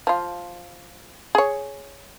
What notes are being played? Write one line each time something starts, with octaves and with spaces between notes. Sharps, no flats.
F3 F4
G#4 C#5